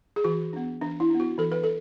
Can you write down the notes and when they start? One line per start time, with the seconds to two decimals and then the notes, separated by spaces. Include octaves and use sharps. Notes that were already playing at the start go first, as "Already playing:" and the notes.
0.16 G#4
0.24 E3 F#4
0.53 B3 D4
0.81 E3 D4
1.00 E4
1.10 B3 D4
1.20 F#4
1.38 E3 A4
1.52 B4
1.64 A4